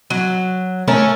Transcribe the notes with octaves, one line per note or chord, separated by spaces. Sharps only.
F#3
A3 C#4 A#4